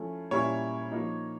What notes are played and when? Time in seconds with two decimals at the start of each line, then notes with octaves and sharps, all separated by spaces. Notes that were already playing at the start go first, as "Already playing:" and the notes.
Already playing: F3 A3 C#4 E4
0.31 A#2 G3 A#3 C#4 E4 C#5
0.91 F3 A#3 D#4